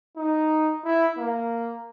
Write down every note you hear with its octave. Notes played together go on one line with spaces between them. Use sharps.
D#4
E4
A#3